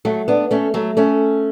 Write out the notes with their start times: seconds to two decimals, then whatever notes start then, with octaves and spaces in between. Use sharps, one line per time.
0.05 F#3 A3
0.28 B3 D4
0.51 A3 C#4
0.74 F#3 A3
0.97 A3 C#4